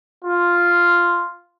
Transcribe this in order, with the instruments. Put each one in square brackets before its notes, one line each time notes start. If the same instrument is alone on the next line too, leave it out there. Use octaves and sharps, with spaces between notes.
[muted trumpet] F4